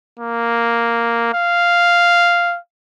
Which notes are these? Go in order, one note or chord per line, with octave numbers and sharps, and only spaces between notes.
A#3
F5